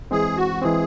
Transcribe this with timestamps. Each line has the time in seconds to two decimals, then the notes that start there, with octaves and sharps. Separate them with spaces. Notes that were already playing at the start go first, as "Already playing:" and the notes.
0.11 E3 G#3 C4 G#4
0.37 F#4
0.62 E3 G#3 C4 G#4